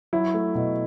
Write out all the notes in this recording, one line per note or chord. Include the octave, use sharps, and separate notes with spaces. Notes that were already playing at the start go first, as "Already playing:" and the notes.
F#3 E4
A3
B2